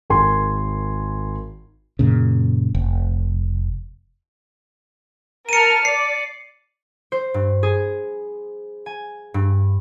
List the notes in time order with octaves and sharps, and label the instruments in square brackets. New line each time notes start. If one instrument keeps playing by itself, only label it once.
[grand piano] G#1 A#4 G#5 C6
[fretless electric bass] F#2 A#2 C#3
F1
[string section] A#4 A5 F6 [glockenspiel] C#7 D#7
[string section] D5 [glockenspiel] C7
[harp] C5
G2
G#4
G#5
G2